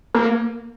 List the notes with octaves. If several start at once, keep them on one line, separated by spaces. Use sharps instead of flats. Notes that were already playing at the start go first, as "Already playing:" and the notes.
A#3